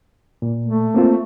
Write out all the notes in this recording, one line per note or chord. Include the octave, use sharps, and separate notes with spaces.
A#2
A3
A#3 C4 F4